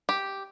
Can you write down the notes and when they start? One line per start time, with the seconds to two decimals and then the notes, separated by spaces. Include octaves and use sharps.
0.09 G4